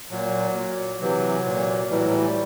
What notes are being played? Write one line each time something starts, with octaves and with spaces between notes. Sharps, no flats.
A#2 F#3
A#2
C3 E3 F#3
A#2
A2 E3 G3
F#3
G3